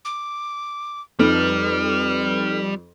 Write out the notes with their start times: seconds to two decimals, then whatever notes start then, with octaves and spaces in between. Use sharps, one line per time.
0.05 D6
1.19 F2 G3 D#4 A4 B4 F6